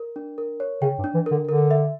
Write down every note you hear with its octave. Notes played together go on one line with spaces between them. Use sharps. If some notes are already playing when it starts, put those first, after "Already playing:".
Already playing: A#4
D4
A#4
C#5
C#3 G5
G2
D4
E3
D3 A#4
D3 A#4
E5